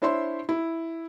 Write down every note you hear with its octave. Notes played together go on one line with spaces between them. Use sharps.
D4 E4 C5 C#5 E5 C6
E4